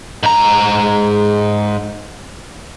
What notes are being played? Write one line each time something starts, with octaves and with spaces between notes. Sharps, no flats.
G#2 A#5